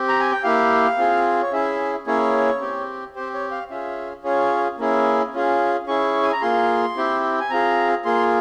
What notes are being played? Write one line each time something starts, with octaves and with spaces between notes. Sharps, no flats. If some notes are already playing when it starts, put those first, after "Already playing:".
Already playing: C4 G4
A#5
G#5
G5
A#3 E4 G4 F5
C4 F4 G#4
C#5
C#4 E4 G#4 E5
A#3 C#4 E4 G#4 C#5
C4 G4
C4 G4 C5
C#5
F5
C#4 F4 G#4 E5
C#4 F4 G#4 C#5
A#3 C#4 E4 G#4
C#4 F4 G#4
C#4 E4 G#4 C#6
G#5
A#5
A#3 F4 G#4 C6
C4 E4 G4
G#5
C4 F4 G#4 A#5
A#3 F4 G#4 C6